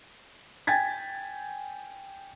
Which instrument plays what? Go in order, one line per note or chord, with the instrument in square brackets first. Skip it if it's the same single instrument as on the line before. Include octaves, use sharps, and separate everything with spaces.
[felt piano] G5 G#5 G#6 A6 B6